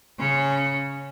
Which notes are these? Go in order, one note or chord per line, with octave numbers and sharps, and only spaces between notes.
C#3 C#4